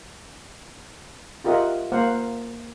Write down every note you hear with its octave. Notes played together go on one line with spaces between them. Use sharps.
F4 G4 A#4 D#5 E5 F#5
A#3 C5 F5 F#5